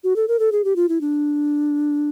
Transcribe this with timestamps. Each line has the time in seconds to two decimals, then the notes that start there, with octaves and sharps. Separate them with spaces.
0.04 F#4
0.16 A4
0.28 A#4
0.39 A4
0.52 G#4
0.64 G4
0.76 F4
0.89 E4
1.01 D4